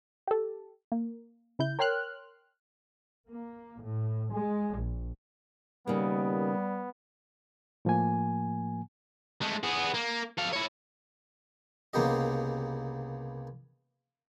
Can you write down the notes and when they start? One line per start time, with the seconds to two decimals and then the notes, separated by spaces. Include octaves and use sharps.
0.28 G4 A4
0.92 A#3
1.59 C#3 E4 G6
1.79 A#4 C#5 G5 C6 F6 F#6
3.27 A#3
3.82 A2
4.32 G#3
4.75 A#1
5.87 D#2 C#3 G3 A#3 B3
7.85 A2 F3 A#3 G#5
9.42 G#3 A3
9.64 B3 G#4
9.94 A#3
10.38 A4 F5
10.53 E4 C#5
11.93 C2 C#3 A#3 B3 G4 D#5